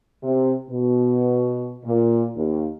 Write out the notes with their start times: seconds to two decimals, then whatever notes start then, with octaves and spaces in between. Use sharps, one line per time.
0.23 C3
0.70 B2
1.84 A#2
2.36 D#2